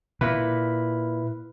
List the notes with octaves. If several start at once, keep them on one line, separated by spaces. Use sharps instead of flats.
A#2 E4 B4